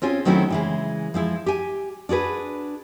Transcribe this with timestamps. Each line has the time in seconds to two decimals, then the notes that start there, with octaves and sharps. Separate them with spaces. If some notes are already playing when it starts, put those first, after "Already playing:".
0.02 C4 C#4 F4 G#4
0.25 D#3 F#3 A3 C4 C#4 E4
0.50 C#3 E3 G#3
1.14 F3 G#3 E4
1.46 G4 G#5
2.09 D4 F#4 G#4 B4